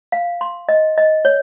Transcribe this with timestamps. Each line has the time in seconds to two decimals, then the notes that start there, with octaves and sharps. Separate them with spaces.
0.12 F5
0.41 C6
0.69 D#5
0.98 D#5
1.25 C#5